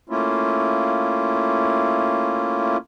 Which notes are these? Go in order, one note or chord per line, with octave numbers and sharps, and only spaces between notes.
A3 A#3 C#4 E4 F4